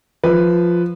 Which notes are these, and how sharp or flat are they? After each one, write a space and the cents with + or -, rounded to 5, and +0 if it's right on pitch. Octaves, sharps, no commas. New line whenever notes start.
F3 +0 B4 +0